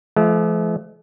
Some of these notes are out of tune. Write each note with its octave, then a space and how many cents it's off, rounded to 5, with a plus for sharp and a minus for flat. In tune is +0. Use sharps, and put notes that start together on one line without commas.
F3 -40 A3 -45 F5 +0